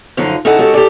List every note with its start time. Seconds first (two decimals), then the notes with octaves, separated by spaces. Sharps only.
0.17 F#2 D3 F3 D#4 F4
0.45 C#4 D#4 E4 G#4 A4 F#5
0.59 G#3 C#4 F#4 G4 A4
0.74 G4 A4 D5